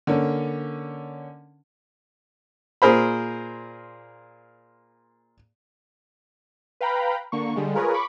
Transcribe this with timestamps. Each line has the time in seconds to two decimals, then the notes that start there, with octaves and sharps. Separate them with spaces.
0.07 D3 A#3 C#4
2.82 A#2 G#4 A#4 C5 B5
6.81 B4 F5 G5 A#5 B5
7.32 D3 A#3 C#6
7.56 D3 G3 G#3
7.74 F4 G#4 A#4 B4 C#5
7.94 B5 C#6 D6